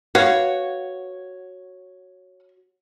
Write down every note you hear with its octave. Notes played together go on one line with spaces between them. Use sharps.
F#4 B4 C#5 F5 F#5